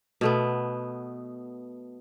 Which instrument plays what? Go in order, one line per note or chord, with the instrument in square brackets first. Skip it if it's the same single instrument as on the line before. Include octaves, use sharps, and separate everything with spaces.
[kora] B2 A3 B3